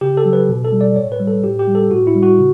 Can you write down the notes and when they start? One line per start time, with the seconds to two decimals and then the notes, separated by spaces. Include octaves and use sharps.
0.01 C#3 G4
0.17 A4
0.25 F#3
0.33 B4
0.49 B2
0.65 A4
0.72 G3
0.81 D5
0.96 A2 C#5
1.12 B4
1.20 G3
1.27 A4
1.44 A2 G4
1.59 G4
1.67 E3 G3
1.75 A4
1.91 A2 F#4
2.07 E4
2.15 G3
2.23 F#4
2.38 C#3